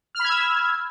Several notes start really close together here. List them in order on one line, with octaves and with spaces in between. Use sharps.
F6 B5 G#6 E6